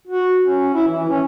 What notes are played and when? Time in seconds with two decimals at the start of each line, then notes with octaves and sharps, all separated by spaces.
0.07 F#4
0.45 C#4
0.74 E4
0.87 E3
1.09 C#4